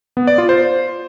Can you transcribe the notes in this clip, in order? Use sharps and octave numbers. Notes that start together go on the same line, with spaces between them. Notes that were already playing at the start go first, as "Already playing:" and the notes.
B3
D5
F4
C5